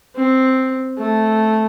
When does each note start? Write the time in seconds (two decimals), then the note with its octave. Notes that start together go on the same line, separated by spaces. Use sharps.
0.16 C4
0.98 A3